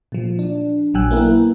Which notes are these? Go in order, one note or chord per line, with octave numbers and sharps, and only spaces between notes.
A#2 F3
D4
A#1 F#3 G5 G#5 E6 F#6
A#3 B3 E4 A#4